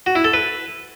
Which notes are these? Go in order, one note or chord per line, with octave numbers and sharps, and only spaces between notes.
F#4
E4
A4
B4